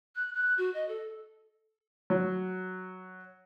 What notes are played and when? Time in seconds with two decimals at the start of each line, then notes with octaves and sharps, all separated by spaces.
0.16 F#6
0.34 F#6
0.58 F#4
0.74 D#5
0.89 A4
2.10 F#3